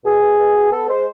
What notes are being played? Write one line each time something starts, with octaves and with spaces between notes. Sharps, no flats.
B2 G#4
B2
B2
B2
B3 A4
G#3 C5